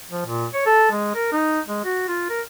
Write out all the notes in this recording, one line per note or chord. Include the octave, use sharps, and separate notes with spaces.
F3
A#2
C#5
A4
G#3
A#4
D#4
G#3
F#4
F4
A#4